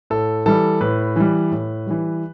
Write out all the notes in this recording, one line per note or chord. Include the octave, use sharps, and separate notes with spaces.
A2 A4
E3 G3 A4
A2 B4
E3 G3
A2
E3 G3